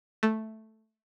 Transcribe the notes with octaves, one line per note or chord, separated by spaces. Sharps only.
A3